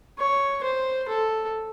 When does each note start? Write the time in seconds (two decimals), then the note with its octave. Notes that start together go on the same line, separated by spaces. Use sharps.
0.19 C#5
0.63 C5
1.08 A4